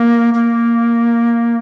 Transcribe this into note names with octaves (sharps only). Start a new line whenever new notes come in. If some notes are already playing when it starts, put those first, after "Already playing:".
Already playing: A#3
A#3